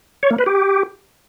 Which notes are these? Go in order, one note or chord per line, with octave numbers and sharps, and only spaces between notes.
C#5
A#3
B4
G4